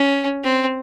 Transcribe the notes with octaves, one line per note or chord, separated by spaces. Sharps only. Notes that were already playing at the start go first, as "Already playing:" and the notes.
Already playing: C#4
C4